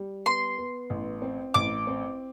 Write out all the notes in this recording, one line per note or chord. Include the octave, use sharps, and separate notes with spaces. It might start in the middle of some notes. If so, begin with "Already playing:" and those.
Already playing: G3
B3 C6
B3
A1
C4
A1 D6
C4